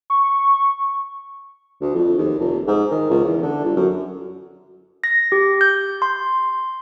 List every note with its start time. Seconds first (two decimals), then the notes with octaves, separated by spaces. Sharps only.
0.10 C#6
1.81 D2
1.95 F2
2.18 D#2
2.39 F1
2.67 G#2
2.91 D#3
3.10 C#2
3.25 E2
3.42 D3
3.64 G1
3.76 F#2
5.04 A#6
5.32 G4
5.61 G6
6.02 C6